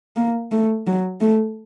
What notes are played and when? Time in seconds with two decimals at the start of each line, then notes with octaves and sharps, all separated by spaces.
0.16 A#3
0.52 A3
0.87 F#3
1.21 A3